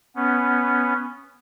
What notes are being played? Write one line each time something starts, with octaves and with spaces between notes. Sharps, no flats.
B3 C#4